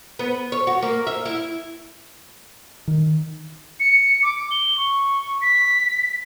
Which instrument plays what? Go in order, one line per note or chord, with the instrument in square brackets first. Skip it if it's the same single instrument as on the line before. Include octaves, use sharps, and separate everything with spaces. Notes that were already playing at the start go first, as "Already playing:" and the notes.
[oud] B3
C#5
F#4
A#3
E5
E4
[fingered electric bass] D#3
[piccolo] C#7
D6
G7
C#6
B6